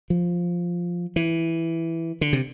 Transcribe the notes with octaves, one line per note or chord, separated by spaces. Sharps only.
F3
E3
D3
C3